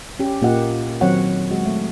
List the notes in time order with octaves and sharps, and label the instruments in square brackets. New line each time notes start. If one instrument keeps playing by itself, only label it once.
[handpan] C#4 G4
A#2 A#3 F4 G4 D#5 F#5
D#3 F#3 C4 C#5 F#5
G#3 F#4
A3